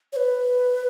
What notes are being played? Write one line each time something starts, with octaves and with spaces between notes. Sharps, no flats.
C#5
B4